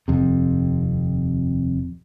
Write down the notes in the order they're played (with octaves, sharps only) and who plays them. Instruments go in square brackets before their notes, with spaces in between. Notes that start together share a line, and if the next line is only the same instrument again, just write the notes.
[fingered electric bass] D#1 F2 C3